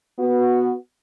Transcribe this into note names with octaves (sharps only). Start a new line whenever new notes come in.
B3 F#4